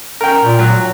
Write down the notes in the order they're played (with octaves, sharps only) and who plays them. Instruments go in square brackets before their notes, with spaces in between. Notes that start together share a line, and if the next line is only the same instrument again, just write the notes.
[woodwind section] C#4 [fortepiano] A#4 G5
[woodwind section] A#2
[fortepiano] F#3